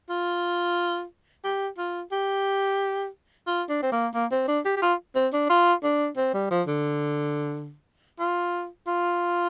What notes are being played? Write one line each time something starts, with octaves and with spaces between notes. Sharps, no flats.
F4
G4
F4
G4
F4
D4
C4
A#3
A#3
C4
D4
G4
G4
F4
C4
D4
F4
D4
C4
G3
F3
D3
F4
F4